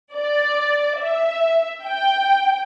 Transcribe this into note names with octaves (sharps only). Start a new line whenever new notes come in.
D5
E5
G5